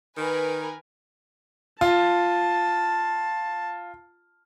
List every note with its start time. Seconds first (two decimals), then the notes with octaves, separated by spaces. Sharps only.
0.17 D#3 A#4 B4 G#5
1.81 F4 A5